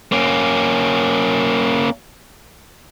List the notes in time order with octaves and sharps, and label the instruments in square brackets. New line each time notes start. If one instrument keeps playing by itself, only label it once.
[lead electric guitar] A#3 C#4